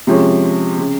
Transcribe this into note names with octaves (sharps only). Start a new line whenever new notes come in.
C3 F3 G#3 C#4
C#3